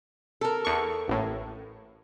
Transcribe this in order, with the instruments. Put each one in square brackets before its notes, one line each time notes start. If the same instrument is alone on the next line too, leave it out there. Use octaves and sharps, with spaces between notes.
[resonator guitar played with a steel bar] A4 A#4
[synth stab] E2 C#6
A1 A2